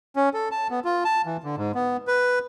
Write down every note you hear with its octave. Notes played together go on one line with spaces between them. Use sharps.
C#4
A4
A5
B3
F4
A5
E3
D3
G#2
B3
B4